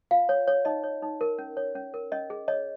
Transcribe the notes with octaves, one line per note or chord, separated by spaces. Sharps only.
F4 F5
C#5
C#5
D#4 D#5
C#5
D#4
A#4
C#4
C#5
C#4
A#4
C#4 D#5
G#4
C#5 D#5